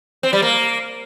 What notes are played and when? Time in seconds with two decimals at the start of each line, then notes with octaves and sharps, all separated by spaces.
0.23 C4
0.33 G3
0.42 A#3